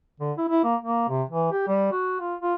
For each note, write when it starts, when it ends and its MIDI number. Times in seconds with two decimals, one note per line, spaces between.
0.20 0.33 50
0.38 0.47 64
0.49 0.60 64
0.64 0.76 58
0.81 1.08 58
1.09 1.23 48
1.30 1.51 52
1.52 1.64 67
1.68 1.91 55
1.92 2.17 66
2.20 2.35 65
2.41 2.55 65